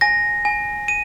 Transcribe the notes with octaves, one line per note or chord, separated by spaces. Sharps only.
G#5 A#6
G#5
D#7